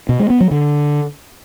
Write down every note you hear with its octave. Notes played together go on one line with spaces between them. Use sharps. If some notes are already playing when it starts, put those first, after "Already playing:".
B2
G#3
B3
F#3
D3